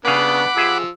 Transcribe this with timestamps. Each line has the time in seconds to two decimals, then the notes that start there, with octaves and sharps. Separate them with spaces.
0.05 C#3 B3 D4 F5 F#5 G#5 B5 D6
0.57 F3 G4 G#4 E5 E6